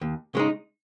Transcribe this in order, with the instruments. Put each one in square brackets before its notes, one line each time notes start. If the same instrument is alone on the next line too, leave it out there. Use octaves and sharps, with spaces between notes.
[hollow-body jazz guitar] D#2
C#3 G#3 D#4